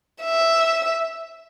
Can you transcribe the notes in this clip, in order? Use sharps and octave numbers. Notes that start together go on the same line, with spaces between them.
E5